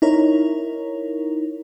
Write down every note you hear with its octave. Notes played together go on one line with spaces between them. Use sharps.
D#4 E4 A#4 C#5